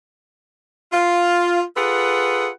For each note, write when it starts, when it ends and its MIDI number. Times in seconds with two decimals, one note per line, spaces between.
0.92 1.62 65
1.77 2.49 65
1.77 2.49 68
1.77 2.49 69
1.77 2.49 71
1.77 2.49 78